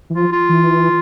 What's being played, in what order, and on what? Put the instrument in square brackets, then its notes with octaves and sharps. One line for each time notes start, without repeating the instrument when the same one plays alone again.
[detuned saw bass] E3
[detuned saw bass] F3 [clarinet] F4
[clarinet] F4
[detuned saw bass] E3